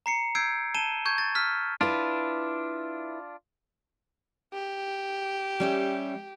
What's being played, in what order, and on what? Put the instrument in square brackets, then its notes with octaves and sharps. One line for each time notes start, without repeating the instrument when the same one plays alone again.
[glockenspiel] A#5 C7 C#7
E6 G6 G#6 C7 D7
A5 D#7 E7 G7
C#6 G6 G#6
A6
E6 F6 B6
[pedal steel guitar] D4 F4 [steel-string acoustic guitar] E4 B4
[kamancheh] G4
[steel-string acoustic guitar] G3 C#4 E5